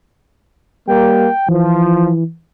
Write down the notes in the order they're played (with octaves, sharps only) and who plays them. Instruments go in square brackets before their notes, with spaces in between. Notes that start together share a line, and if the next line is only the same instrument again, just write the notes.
[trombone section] G3 A#3 [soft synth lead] G5
[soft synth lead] E3 [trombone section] F3